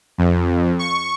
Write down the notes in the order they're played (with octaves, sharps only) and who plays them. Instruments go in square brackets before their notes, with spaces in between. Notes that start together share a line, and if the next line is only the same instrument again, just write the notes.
[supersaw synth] F2
C#6